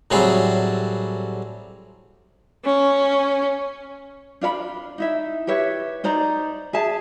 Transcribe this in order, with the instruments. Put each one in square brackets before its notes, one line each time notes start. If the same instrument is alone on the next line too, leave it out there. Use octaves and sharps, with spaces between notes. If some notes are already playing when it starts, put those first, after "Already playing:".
[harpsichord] A2 F#3 G3 C4 G#4 A4
[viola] C#4
[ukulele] D4 F4 D5 B5
D#4 E4 E5
G4 B4 C#5 E5
D#4 C5 D5 A#5
G#4 E5 A5